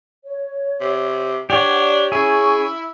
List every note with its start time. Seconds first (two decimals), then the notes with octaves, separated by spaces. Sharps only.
0.25 C#5
0.80 C3
1.50 D4 G4 C#5 D5 F#5
2.12 C#4 E4 G#4 G#5 C#6